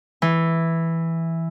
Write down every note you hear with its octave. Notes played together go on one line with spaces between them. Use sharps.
E3